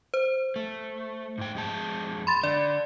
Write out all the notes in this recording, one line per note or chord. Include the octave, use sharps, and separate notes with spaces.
C5
A3
G#2 G5
F2 G#3 A5
B5 C6 A6
D3 D5